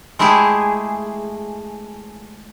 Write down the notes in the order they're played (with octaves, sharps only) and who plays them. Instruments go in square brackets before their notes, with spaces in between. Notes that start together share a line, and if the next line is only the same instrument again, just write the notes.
[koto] G#3 A3 E4 G4 G#4